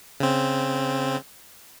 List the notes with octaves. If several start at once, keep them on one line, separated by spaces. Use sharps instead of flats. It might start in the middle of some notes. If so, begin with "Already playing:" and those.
C#3 C4